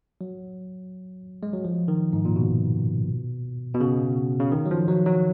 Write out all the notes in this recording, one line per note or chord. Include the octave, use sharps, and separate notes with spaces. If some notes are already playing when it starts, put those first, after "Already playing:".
F#3
G#3
F#3
F3
D#3
G#2
A#2
B2
B2
C#3
C#3
D#3
F#3
F3
F#3
F#3